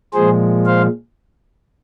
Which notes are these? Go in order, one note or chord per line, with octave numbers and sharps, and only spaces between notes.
A#2 F3 G#3 G#4 C5
C5 F5